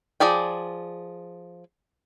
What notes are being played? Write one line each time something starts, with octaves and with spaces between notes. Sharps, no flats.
F3 G#4 D5 G5